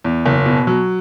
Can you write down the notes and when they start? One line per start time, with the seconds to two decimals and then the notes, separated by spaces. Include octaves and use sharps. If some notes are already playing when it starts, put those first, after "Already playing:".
0.05 E2
0.26 F#1
0.46 B2
0.67 F#3